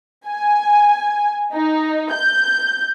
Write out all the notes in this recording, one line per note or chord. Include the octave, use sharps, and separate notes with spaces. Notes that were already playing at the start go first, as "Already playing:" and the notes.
G#5
D#4
G6